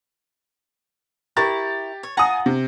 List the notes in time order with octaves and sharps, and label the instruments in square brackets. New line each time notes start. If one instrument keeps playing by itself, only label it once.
[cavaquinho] E4 A#4 C#6 [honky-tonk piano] G4 A6
[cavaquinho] C#5
[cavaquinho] F4 F#5 A#5 [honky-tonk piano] G#5 D#6
[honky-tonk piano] C3